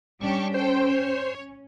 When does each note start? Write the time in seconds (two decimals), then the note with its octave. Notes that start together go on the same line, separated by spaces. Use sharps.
0.21 G3 C#4 D4 G4 C#6
0.54 A4 C5 G5
0.88 C#5